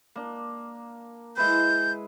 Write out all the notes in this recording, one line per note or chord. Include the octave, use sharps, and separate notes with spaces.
A#3 D4
G#3 E4 B4 G6